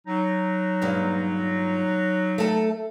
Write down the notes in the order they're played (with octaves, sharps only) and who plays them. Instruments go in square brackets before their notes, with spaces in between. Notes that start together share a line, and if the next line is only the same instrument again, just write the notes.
[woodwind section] F#3 D#4
[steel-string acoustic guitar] G2 A#2 G#3
A3 A4